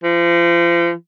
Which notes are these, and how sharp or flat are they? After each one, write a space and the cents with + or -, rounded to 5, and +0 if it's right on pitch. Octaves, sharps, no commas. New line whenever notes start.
F3 -35